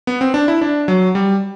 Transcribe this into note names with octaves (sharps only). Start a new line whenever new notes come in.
B3
C4
D4
E4
D4
F#3
G3